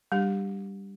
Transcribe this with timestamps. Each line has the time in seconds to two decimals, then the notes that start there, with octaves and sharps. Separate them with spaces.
0.12 G3 D4 G4